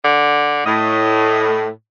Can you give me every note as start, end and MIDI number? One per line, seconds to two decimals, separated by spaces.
0.04 0.63 50
0.66 1.67 45
0.66 1.65 75